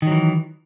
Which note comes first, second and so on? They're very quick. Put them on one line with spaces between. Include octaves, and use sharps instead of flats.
D#3 F#3 E3